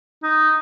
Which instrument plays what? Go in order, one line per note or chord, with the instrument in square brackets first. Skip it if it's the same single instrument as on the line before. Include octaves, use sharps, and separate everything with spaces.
[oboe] D#4